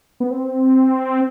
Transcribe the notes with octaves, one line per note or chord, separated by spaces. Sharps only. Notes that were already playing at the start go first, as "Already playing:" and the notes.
B3
C4